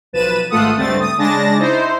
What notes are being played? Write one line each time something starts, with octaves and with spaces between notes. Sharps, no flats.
B1 F3 B4 A6 D#7 E7
G#1 A3 F4 A4 F#5 D#6
C#2 G2 A3 C4 A6
D#6
C#3 G#3 D4 A5 A6 A#6
D#4 E4 C5